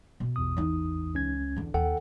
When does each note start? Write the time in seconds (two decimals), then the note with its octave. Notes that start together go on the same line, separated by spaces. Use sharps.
0.20 B2
0.36 A1 E2 D#6
0.57 E3 D#4
1.14 C#2 C#4 G#6
1.56 E2 D3
1.74 D#2 A4 F#5 G5